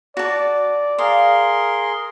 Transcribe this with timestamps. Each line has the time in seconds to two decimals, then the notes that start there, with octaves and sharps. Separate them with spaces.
0.17 F#4 D5 A5
0.98 G#4 A#4 F5 C6